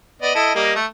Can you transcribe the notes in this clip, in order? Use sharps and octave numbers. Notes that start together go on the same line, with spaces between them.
B3 D5 D#5
E4 A4 D#5
G3 A#3 D#5
A3